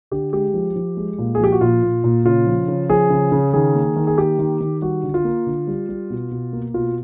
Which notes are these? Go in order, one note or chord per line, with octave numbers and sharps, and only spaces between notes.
D3 G4
G#3 G4
F3
F3
G#3
A#2
G#4
F3 G4
F#4
A#2 F4
A#2
A#2
C#3 F4
F3
C#3
F3 G#4
C#3
C#3
D#3 G#4
A#3
D#3
G#4
A#3 G4
D#3
D#3
G3 F#4
D3
F4
A#3
D3
G3
G3
B2
B2
A#3
B2 F4